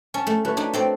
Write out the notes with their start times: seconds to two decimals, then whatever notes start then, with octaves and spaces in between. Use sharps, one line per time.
0.14 C#4 A5
0.27 A3
0.45 A3 F#4 B4 C#5
0.57 D4 D#4
0.73 A3 C4 D5